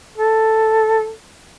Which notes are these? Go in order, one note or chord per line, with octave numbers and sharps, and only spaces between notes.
A4